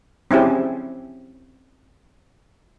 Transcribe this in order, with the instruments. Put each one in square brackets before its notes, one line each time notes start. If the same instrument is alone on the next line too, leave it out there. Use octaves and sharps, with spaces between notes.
[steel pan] C4 C#4 E4 G4 G#4